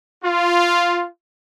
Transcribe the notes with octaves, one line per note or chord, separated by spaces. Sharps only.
F4